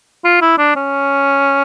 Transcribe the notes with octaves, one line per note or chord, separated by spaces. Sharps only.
F4
E4
D4
C#4